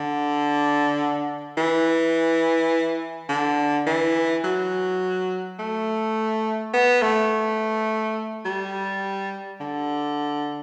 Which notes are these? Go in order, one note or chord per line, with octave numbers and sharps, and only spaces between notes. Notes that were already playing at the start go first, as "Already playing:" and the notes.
Already playing: D3
E3
D3
E3
F#3
A3
B3
A3
G3
D3